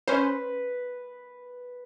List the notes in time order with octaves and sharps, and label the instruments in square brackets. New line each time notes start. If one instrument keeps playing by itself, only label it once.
[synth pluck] C#4 C5 [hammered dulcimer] B4